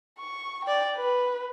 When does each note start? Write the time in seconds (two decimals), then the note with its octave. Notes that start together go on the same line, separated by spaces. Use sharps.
0.19 C#6
0.65 D5 G5
0.97 B4